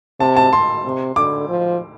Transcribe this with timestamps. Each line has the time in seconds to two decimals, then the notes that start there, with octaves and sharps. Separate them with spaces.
0.20 C3 A5
0.36 A5
0.53 C6
0.84 C3
1.16 D3 D6
1.49 F3